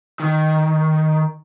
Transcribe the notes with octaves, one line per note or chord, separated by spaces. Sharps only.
D#3